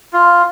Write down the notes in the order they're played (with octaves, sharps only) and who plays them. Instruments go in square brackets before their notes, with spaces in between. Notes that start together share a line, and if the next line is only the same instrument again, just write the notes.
[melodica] F4